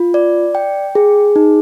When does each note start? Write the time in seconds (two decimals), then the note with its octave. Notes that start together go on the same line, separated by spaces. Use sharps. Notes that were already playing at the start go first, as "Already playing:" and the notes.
Already playing: F4
0.14 D5
0.55 G5
0.95 G#4
1.36 D#4